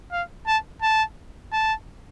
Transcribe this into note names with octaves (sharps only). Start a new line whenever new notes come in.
F5
A5
A5
A5